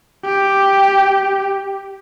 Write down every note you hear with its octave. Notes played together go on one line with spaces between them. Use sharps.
G4